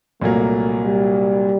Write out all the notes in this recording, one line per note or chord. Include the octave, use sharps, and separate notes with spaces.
C2 A#2 F#3 A3 A#3
G3